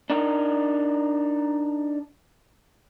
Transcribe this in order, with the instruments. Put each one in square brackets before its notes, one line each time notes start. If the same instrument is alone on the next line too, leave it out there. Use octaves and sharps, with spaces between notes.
[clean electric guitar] D4 D#4 A#4